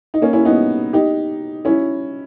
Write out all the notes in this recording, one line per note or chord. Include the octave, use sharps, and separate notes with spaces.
D#4
A#3 C#4
C#4 E4
B3 D#4
D#4 G4
C#4 E4